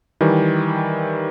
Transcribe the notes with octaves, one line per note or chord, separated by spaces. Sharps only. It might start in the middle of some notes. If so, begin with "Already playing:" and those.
D#3 E3 G3